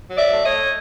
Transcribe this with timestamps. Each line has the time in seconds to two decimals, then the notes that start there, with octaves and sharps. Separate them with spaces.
0.09 F#3
0.17 D5 E5
0.31 A2
0.46 C#5 D#5
0.53 A3